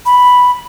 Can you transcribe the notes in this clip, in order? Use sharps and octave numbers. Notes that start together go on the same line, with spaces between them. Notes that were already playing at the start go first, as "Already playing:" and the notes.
B5